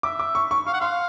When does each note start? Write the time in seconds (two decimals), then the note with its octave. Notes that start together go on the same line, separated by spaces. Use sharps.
0.03 E5 D6
0.19 D6
0.35 C#6
0.51 C#6
0.67 F5 C#6
0.73 F#5
0.81 F5 C6